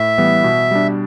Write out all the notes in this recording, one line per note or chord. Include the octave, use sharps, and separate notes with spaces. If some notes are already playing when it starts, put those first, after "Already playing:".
Already playing: A2 E5
E3 G3 B3 E4
B2
G3 D4